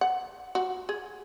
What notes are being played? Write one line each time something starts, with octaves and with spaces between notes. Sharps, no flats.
F#5
F#4
G#4